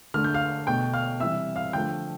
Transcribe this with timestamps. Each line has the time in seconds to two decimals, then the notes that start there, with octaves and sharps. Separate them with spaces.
0.14 D3 A3 F6
0.24 G6
0.34 F5 F6
0.67 B2 A3 G5 G6
0.93 F5 F6
1.20 C3 E3 G3 E5 E6
1.56 F5 F6
1.73 D3 F3 A3 G5 G6